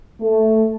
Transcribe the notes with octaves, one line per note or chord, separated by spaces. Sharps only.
A3